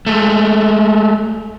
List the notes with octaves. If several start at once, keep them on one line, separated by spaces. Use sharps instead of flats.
G#3 A3